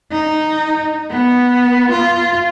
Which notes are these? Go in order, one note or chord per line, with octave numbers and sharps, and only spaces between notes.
D#4
B3
F4